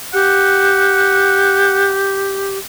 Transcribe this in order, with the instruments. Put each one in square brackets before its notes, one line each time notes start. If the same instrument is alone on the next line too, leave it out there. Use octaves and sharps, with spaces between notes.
[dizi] G4 [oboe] F#5